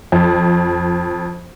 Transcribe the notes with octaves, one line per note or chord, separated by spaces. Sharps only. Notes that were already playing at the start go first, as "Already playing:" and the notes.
F2